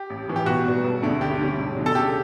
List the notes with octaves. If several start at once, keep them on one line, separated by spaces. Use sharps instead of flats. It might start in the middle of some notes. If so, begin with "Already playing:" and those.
Already playing: G4
A1
A2 E3
G4
B1 F#4
B2 G3 B3
E1
D2 D3 A3
D2 G4
D3 G3 C#4
E1
E2 D3 F#3
A4
C#3 G4